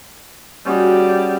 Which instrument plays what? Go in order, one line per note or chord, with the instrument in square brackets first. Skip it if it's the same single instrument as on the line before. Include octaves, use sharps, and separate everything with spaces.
[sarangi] G3 [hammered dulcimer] C#4 F#4 G#4